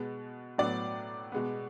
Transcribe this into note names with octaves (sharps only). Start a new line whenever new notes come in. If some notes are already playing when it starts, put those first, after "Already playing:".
Already playing: B2 G#3 B3
A2 F#3 B3 D5
B2 G#3 B3